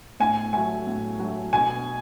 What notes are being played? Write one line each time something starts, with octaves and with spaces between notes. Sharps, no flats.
A2 G#5
F#3 A3 G#5
A2
F#3
A3
B2 G#5